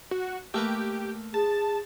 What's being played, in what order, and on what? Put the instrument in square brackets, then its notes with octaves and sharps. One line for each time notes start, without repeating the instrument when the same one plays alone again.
[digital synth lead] F#4
[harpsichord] A3 A#3 B4 [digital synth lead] G4
[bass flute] G#4 [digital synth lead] A5